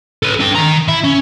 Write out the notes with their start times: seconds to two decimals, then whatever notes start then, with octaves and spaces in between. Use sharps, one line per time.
0.23 A4 B4
0.40 D4 G5
0.55 D#3 A#5
0.88 E4
1.04 C#4